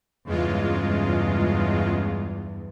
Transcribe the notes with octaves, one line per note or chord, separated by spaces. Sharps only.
E2 G2 C#3 G#3 F4